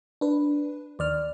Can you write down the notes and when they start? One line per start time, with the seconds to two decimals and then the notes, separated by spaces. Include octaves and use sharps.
0.21 D4 B4
0.99 D#2 D5 F6